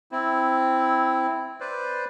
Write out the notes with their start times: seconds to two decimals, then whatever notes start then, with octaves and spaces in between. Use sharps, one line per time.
0.12 C4 E4
1.60 B4 C5 D5